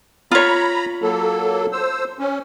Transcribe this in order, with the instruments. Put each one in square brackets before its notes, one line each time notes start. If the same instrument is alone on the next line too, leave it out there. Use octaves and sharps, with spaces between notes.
[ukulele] F4 C#5 [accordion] A#5 B5
[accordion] F#3 A#3 A4
C5 E6
C#4